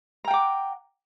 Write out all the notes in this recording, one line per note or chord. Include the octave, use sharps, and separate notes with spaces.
F#5 G5 A#5 D6